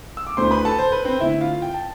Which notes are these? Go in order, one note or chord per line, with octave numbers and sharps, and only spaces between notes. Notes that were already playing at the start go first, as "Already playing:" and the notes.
E6
D6
D2 D3 A3 E4 C5 C6
B4 B5
A4 A5
C5
B4
C4 C5
D3 A3 C4 E4 E5
F4 F5
G5
A5